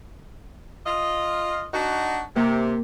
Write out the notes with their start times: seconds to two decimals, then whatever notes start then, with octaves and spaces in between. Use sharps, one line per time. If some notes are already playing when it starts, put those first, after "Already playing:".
0.86 F4 D#5
1.74 D4 D#4 F#4
2.36 C3 A#3